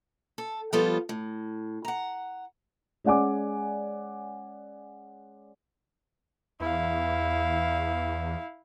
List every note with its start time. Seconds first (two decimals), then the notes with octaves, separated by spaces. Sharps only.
0.38 A4
0.73 F3 G3 B3 F4 A4 C5
1.09 A2
1.85 F#5 A#5
3.04 G#3 C#4 D5 F#5 G#5 D6
6.60 E2 E4 F5